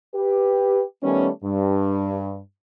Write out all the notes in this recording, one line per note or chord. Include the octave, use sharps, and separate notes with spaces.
G4 B4
D#3 G3 A3 B3 C#4
G2